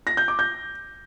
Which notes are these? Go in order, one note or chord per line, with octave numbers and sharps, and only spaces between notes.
A#6
G6
D6
G6